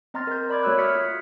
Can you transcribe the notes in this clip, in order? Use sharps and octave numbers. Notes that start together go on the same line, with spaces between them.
C4 D#5 A#5 C6 F6 A6
A#4 G6
D5 B5 D6 G#6
A3 F#4 C#5 E6 F#6
D#6 F6 G#6 B6 C#7
F4